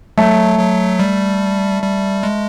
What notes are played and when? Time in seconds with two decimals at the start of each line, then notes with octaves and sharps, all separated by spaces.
0.18 F#3 A3
0.59 F#3
1.00 G3
1.82 G3
2.23 G#3